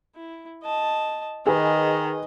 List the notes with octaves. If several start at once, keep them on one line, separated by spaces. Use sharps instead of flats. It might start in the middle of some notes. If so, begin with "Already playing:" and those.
E4
D#5 A5
D#3 G#4 B4 D#5